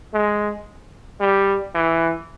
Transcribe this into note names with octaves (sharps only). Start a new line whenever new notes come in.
G#3
G3
E3